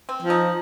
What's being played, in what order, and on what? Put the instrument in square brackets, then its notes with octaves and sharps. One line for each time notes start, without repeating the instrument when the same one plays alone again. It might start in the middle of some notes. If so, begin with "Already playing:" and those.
[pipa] C4
[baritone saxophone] F3
[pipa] D#4